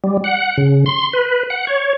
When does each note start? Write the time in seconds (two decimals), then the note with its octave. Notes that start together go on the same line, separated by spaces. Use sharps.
0.04 G3
0.24 F#5
0.58 C#3
0.86 C6
1.13 B4
1.50 F#5
1.67 C#5